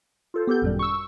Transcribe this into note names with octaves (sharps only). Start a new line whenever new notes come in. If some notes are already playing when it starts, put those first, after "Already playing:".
F4 A4 C5
B3 G4 A4 G6
G#1 F#2 A#2 G3
C#6 E6